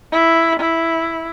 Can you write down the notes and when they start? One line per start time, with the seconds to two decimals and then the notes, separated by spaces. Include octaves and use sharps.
0.12 E4
0.60 E4